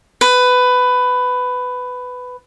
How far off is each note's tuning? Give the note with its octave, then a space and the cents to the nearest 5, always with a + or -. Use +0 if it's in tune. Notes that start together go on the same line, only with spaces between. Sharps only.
B4 +15